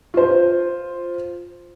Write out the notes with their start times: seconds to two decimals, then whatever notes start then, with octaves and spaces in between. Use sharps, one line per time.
0.14 F4 C5